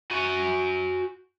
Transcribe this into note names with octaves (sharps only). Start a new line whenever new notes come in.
F#4 G#5